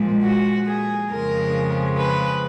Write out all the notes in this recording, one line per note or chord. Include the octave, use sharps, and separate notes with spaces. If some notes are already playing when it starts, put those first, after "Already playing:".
Already playing: A#2 F3 G#3
F#4
G#4
F2 C#3 F3 G#3 A#4
B4